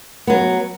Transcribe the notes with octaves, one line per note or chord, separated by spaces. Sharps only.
F#3 B3